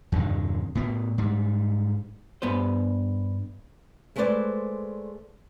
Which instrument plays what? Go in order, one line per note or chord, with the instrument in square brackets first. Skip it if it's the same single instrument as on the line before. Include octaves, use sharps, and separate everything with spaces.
[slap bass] E2 G2 C3 D#3
A2 B3
G#2 G3
[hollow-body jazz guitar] G2 B3 B4 C5
[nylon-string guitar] G#3 A3 B3 B4 C5 D5